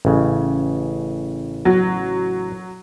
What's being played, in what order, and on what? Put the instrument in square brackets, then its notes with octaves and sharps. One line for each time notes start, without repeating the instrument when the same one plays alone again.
[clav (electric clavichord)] A1 C#3
[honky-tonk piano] F#3